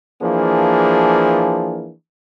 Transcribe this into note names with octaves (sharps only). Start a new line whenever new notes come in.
E3 F3 A#3 D4 G#4